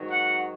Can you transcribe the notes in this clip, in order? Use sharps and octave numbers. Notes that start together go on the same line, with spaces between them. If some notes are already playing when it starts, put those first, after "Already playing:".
Already playing: G#2 D#3 F#3
F#5